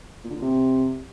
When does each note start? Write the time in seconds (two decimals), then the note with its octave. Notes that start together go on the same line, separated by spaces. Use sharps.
0.24 A#2
0.30 D3
0.36 A#2
0.42 C3